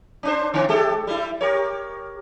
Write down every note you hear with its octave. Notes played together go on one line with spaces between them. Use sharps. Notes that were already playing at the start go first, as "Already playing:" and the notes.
C#4 D4 C5
D3 C4
G#3 G4 A4
G3 E4
G4 A#4 C#5